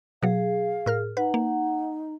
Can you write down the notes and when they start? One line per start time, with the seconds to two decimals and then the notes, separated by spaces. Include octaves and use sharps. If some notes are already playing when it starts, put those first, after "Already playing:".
0.23 B2 F#3 G#4 F5
0.86 A2 A#4 F6
1.17 D#4 B4 F#5
1.34 A#3